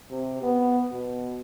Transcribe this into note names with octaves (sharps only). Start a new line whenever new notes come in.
C3
B3
B2